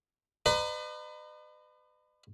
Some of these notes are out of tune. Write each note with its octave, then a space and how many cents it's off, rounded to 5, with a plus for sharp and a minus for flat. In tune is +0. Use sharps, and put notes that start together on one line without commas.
B4 +30 D#5 -45 A#5 +0